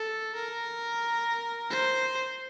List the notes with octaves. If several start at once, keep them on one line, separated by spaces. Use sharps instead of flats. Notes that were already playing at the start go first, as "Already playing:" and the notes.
Already playing: A4
A#4
C5